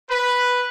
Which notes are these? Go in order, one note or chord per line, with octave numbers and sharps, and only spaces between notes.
B4